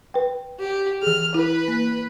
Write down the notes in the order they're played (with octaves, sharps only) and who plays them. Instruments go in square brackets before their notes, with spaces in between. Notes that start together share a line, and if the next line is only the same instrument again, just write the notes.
[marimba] B4 G5
[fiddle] G4
[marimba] E3 G#4 [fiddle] F6
[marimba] E4 [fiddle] B4
[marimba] A#3